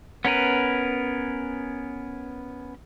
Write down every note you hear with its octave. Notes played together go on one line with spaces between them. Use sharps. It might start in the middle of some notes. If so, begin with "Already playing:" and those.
B3 C#4 A#4 B4